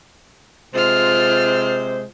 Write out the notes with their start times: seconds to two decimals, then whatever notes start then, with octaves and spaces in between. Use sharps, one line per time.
0.74 C3 G#3 F4 C5 F6